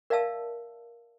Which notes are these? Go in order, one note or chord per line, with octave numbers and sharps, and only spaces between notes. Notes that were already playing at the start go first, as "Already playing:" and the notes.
A#4 D5 E5 F5 A5 E6